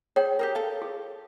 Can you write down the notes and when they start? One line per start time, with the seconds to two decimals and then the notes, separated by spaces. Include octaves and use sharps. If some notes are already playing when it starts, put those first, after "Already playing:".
0.16 G#4 C#5 G5
0.39 G4 G#4 A#4
0.55 A4 F5
0.82 G#4